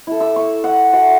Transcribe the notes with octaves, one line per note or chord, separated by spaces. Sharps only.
E4 A4
D6 E6
C#6
F#5
F#4 A4 E5 F#5